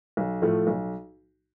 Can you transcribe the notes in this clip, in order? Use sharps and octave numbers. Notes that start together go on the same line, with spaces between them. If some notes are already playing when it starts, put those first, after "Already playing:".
B1
A2 F3 A3 F4
B1